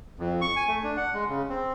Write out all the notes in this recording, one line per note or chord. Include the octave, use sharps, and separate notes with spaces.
F2
C#6
G#5
A3
D4
F#5
G#3
C#3
C4